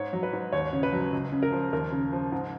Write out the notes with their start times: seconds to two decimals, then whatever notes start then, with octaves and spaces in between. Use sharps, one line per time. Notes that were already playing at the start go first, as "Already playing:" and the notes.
Already playing: G#2 C#5
0.13 F#3
0.23 B4
0.33 G#2
0.52 D#2 C#5
0.73 C#3
0.83 B4
0.92 F#3
1.13 C#2
1.32 C#3
1.43 A#4
1.52 F3
1.73 D#2 A#4
1.92 C#3
2.12 F3
2.32 G#2